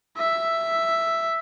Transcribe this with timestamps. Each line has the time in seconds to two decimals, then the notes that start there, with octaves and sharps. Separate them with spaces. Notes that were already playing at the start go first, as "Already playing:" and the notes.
0.18 E5